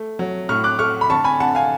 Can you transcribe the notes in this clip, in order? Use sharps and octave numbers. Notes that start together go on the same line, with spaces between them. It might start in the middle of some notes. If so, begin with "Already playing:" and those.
Already playing: A3
F#3
A2 C#6 F6
D6 F#6
A3 C#6 F6
B5
D3 A5 C#6
G#5 B5
D3 F#5 A5
F5 G#5